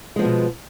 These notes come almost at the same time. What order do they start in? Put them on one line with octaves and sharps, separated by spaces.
G#3 F3 B3 B2